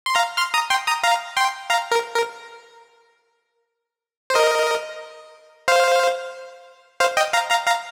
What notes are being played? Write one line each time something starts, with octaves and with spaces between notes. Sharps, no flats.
C6
F5 A#5
C6 F6
A#5 D#6
G5 C6
A#5 D#6
F5 A#5
G5 C6
F5 A#5
A#4
A#4
C5
A#4 D#5
C5 F5
C5 F5
D#5 G5
F5 A#5
F5 A#5
F5 A#5